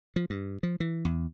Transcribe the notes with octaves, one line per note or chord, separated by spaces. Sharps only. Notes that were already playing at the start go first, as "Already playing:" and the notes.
F3
G2
F3
E3
E2